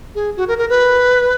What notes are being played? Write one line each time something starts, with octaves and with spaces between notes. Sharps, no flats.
G#4
F#4
A#4
A#4
B4